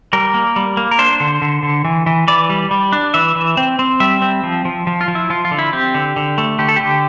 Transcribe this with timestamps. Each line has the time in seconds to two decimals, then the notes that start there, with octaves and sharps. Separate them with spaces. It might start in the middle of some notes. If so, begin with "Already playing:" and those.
0.13 G3 A#4
0.34 A#3
0.56 G3
0.77 A#3
0.91 A#4
0.99 D4 C5
1.20 D3
1.42 D3
1.63 D3
1.85 E3
2.06 E3
2.28 E3 D5
2.50 G3
2.71 G3
2.93 D4
3.14 E3 E5
3.36 E3
3.57 C4
3.79 C4
4.00 G3 E5
4.22 C4
4.44 F3
4.65 F3
4.87 F3
5.01 F4
5.08 F3
5.15 E4
5.30 F3 F4
5.45 F4
5.51 D3
5.59 E4
5.73 C4 G4
5.94 D3
6.16 D3
6.38 A3
6.59 D3 G4
6.68 A4
6.76 D3 G4